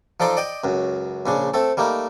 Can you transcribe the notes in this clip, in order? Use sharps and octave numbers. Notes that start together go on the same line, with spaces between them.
F3 D#4 A4 D5 C6
D5 D#5 G5
C#2 F#2
A#1 C#3 D4
A3 C4 A4
G3 A3 A#3 D#4